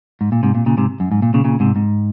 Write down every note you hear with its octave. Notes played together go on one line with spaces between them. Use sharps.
G#2
A#2
G#2 C3
A#2
A#2 C#3
G#2 C3
F#2
G#2
A#2
A#2 C#3
A#2 C#3
G#2 C3
G#2